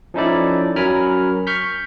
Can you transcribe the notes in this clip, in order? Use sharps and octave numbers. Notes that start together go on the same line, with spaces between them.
F3 C#4 D#4 E4 A4 D5
F#3 C#4 A#4 G#5 B5 F6
C#6 F6 G6 B6